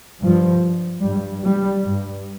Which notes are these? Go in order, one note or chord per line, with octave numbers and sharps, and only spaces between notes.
G2 F3
G2 G3
G3
G2